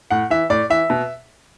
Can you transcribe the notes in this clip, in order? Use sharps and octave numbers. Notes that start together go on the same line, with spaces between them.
A2 F#5
E3 E5
A2 D5
E3 E5
B2